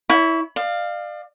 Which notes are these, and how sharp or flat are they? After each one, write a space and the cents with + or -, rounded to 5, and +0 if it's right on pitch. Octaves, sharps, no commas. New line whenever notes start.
E4 -10 C#5 +30 C#6 +30
D5 +40 F5 +0